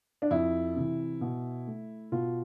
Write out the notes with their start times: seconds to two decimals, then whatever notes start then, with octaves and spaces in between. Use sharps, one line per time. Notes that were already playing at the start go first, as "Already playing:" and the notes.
0.22 D4
0.31 F2 E4
0.76 C3 E3
1.21 B2
1.67 A3
2.12 B2 F4